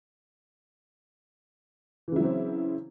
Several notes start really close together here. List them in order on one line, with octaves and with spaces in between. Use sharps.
E3 C#3 E4 F#3 C4